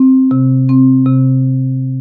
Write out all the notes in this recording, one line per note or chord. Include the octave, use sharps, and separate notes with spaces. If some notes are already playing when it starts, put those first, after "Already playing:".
Already playing: C4
C3
C4
C3